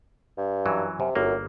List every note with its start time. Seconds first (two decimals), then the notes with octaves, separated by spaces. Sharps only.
0.38 G2
0.66 F#2 E3 F#3
1.00 F#2 C3
1.15 G1 F#2 A#3